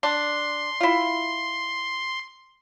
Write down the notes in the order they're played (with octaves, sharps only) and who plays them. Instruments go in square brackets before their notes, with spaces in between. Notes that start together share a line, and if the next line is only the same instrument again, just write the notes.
[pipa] D4 [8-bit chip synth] C6
[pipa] E4 F4